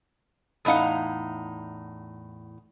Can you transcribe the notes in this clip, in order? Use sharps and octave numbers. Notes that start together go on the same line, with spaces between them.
E2 A2 D#4 F5 F#5